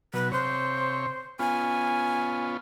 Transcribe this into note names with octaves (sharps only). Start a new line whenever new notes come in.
B2 F#3 B4
C3 C5 C#5
B3 C#4 F4 G#5